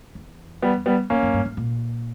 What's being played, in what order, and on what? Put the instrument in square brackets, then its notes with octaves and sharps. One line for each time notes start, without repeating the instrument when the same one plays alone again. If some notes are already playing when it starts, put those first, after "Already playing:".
[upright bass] E2
[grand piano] G3 B3
G3 B3
[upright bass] F#2 [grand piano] A#3 C#4
[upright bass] F#2
G2
G2
A#2